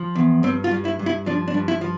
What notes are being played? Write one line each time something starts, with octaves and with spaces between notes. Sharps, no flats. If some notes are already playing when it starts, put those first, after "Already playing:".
Already playing: F3
E2
G2 C4
F4
G2
E4
G2
E4
F3 D4
D4
G2
E4
F3